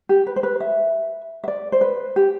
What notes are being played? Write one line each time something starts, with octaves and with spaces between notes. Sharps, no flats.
G4
B4
C5
B4
E5
E5
D5
C5
B4
G4